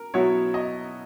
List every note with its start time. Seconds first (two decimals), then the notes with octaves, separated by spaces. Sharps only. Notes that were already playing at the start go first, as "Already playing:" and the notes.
Already playing: A#4
0.14 B2 F#3 B3 E4 C#5
0.54 D#5